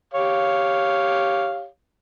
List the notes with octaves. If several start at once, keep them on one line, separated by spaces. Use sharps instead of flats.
G4 C#5 F5